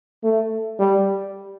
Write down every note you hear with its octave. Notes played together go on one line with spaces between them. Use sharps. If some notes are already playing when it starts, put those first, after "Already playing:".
A3
G3